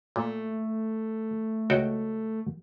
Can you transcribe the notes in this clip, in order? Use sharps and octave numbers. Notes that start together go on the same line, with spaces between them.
A#2 A3
C#2 F#4 G5